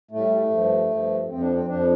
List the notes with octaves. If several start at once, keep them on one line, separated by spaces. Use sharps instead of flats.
A2 G3 A3
G2 F3
G2 F3
F2 F3 C4
D4
C4
F2 F3 D4